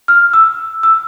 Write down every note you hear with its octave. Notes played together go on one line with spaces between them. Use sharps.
F6
E6
E6